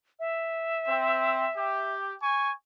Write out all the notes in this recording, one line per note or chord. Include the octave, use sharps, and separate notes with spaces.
E5
C4
G4
G#5 C#6